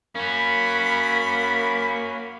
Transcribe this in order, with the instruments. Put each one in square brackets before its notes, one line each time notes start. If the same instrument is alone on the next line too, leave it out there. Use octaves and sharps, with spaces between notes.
[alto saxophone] A#3 [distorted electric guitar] C#4 F#4 [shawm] B5